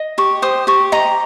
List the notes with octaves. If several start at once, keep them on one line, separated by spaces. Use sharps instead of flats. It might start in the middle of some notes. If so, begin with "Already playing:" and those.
Already playing: D#5
G4 C#6
C5 D#6
G4 C#6
D#5 A#5